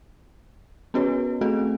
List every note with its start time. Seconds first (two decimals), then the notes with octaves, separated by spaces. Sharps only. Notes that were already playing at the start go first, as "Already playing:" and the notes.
0.94 B3 C#4 F#4 B4 C#5
1.41 A3 C4 F#4 G#4 A4